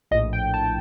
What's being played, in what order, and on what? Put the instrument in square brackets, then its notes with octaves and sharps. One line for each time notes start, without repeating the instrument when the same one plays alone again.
[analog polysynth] A#1 D#5
A2
G5
A5